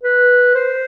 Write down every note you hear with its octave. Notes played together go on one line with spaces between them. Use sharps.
B4
C5